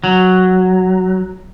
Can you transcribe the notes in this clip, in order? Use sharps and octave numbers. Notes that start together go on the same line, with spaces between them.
F#3